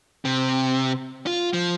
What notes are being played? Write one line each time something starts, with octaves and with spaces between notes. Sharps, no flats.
C3
F4
F3